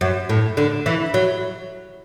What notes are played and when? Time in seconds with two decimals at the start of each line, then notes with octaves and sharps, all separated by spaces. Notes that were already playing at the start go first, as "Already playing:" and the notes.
0.01 F#2
0.29 A2
0.57 D3
0.86 E3
1.14 F#3